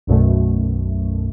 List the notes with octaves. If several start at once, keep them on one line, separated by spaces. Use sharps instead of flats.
B1 F#2 B2 A3